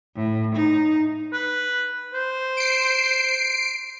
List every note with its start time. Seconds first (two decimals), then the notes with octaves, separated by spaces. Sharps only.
0.16 A2
0.55 D#4
1.33 B4
2.13 C5
2.57 C7 D7